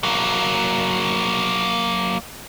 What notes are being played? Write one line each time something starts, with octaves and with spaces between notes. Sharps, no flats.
F#3 A#3